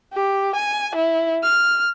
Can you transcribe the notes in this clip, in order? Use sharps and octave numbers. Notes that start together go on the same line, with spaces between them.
G4
G#5
E4
F6